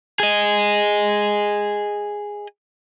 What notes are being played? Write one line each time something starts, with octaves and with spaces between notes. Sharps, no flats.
G#4 D#5